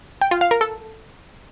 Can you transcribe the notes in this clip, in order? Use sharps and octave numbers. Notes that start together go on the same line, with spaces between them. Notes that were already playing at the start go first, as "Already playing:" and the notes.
G5
F4
F5
A#4
A4